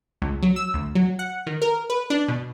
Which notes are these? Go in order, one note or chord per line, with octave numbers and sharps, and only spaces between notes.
C#2
F#3
E6
D2
F#3
F#5
D#3
A#4
B4
D4
B2